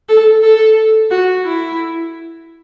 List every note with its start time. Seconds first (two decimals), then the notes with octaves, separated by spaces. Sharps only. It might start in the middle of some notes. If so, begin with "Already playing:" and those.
0.09 A4
0.43 A4
1.11 F#4
1.45 E4